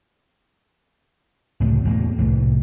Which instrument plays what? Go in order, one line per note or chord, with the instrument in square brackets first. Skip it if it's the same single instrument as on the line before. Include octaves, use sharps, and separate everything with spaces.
[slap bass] C#2 A2 C3
E2 A2 A#3
C2 A2 E3